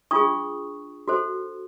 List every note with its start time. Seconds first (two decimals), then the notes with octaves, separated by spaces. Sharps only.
0.11 D4 F4 G#4 C#6 D#6
1.08 F#4 A4 C5